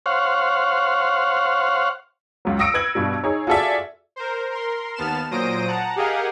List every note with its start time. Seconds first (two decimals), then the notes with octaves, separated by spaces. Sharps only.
0.06 C5 C#5 F5 F#5
2.45 C#2 F#3
2.59 D#6 E6 A#6 C#7 D7
2.74 B4 G#6 F#7
2.95 G2 B2 G3
3.24 D#4 G#4 C#5
3.47 F4 F#4 G#4 A4 D5 E5
4.16 A#4 C5
4.50 A#4 C6
4.95 D#2 B3 A5 F6 E7
5.31 A#2 F#3 C5 D#6 A#6 D7
5.67 F#5 A5 A#5
5.96 G4 G#4 A#4 D#5 F5 F#5